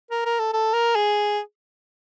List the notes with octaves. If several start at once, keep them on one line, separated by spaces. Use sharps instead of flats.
A#4
A#4
A4
A4
A#4
G#4